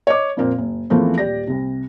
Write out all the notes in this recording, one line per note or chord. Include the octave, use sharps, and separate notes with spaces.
C#5 D#5 D6
F2 A#2 A#3 C4
F#1
E2 E3 F3 A3 A#3 C4
D#1 G4 D5 A#6
C2 C3